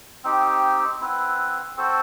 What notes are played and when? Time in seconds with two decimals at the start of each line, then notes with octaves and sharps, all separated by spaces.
0.24 C4 D#4 G4
1.01 C4 E4 B4 F#5
1.76 C4 F#4 A4 C5